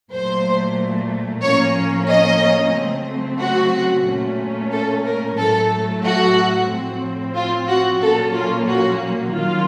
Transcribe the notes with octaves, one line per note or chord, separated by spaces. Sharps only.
A#2 F#3 A3 C5
A2 F3 A#3 C#4 C#5
D#5
C#3 F#3 A3 C4
F#4
A#2 A3 C#4
A4
A#4
A2 F#3 A3 A4
F#4
A2 F3 C4
F4
F#4
A#2 F#3 A#3 C#4 A4
F4
F#4
D#3 F#3 A#3 C#4 F4